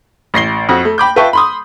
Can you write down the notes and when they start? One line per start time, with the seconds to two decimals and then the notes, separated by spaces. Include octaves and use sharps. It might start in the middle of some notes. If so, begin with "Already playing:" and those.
0.34 A1 A#6 C7 G7
0.69 F2 F#4 A#6
0.85 A3
0.98 G5 B5 D6 G6
1.16 F4 B4 E5 G5 A5 C#6
1.33 B5 C6 D#6